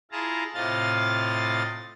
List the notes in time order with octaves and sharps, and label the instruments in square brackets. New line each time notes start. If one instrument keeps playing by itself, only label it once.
[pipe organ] E4 F4 G#4 A5 A#5
A2 C3 F4 D#5 F5 A6